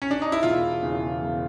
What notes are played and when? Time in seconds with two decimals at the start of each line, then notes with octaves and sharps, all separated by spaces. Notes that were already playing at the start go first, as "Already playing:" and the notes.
0.02 C#4
0.11 D4
0.22 D#4
0.32 E4
0.43 E1 F4
0.83 E2 C#3 E3
1.22 E1